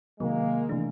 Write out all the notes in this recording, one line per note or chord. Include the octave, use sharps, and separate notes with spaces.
C3 D#3 F#3 G#3 A#3
C3 E3 A3 D4